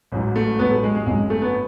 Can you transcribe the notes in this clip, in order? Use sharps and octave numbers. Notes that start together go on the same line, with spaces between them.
A1 G#2 F#3
A3
A1 G#2 F#3 B3
A3
G#3
G#3
G#1 F#2 D3 G#3
A3
B3